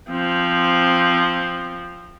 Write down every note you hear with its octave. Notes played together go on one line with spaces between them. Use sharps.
F3 C4